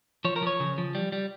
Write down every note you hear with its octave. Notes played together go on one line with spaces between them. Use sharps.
F3 C#5
A#4
F3 C#5
C#3
F3
G3
G3